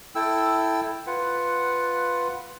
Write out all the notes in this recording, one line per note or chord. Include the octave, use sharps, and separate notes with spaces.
E4 A4 G5 E6
F4 B4 F#5